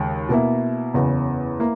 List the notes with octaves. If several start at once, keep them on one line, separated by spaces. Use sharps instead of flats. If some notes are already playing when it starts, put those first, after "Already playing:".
Already playing: D#2 C#3 G#3
B2 A#3 E4
F#1 E2 C#3
A#3 E4